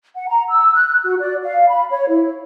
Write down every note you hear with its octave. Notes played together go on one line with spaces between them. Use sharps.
F#5
A#5
E6
F#6
F#4
D5
F5
B5
C#5
E4